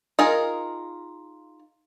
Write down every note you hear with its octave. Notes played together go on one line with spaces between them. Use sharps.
D#4 F4 G#4 A#4